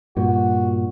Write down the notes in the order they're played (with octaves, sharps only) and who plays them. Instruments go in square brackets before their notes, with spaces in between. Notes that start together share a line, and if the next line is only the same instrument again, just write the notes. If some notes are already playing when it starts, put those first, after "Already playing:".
[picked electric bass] G2 A#2 [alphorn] F#4